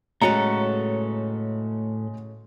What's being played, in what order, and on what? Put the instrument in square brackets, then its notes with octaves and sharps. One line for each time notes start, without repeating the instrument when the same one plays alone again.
[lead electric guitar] A2 A4 [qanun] C#3 F#3 B4 [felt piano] G#3 C#7 [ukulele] A#5